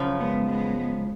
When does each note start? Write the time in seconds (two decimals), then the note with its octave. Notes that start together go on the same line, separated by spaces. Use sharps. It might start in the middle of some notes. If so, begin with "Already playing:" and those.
Already playing: F#2 C#3 F3
0.20 G#3 B3
0.48 G#3 B3